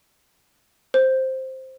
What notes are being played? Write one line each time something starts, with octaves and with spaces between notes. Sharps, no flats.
C5